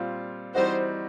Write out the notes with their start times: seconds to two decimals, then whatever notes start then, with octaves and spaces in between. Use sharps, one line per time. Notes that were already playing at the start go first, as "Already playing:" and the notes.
Already playing: A#2 G3 C4 F4
0.55 E3 G3 C4 D#4 F#4 C5